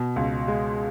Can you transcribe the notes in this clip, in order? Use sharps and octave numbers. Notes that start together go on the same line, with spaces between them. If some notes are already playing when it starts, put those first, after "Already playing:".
Already playing: B2
C#2
G#3